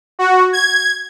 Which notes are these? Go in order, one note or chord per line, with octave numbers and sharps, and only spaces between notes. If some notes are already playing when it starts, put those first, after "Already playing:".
F#4
G#6